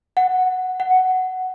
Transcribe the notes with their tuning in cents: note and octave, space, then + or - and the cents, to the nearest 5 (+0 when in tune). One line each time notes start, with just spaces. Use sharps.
F#5 +0
F#5 +10